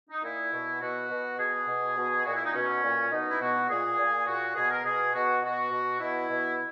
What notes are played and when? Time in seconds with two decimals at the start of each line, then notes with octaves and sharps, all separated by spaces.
0.09 D#4
0.23 A#2 E4
0.52 B2
0.81 B2 F#4
1.10 B2
1.38 B2 G#4
1.67 B2
1.96 B2
2.25 A#2 F#4
2.35 E4
2.44 D#4
2.53 B2 C#4
2.82 A#2
3.11 B2 D#4
3.30 E4
3.40 B2 F#4
3.69 A#2 G#4
3.97 A#2
4.26 A#2 F#4
4.55 B2 G#4
4.70 A#4
4.84 B2 G#4
5.13 B2 F#4
5.42 B2 F#4
5.71 B2
5.99 B2 E4
6.29 B2